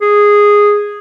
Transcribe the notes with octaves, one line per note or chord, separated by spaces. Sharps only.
G#4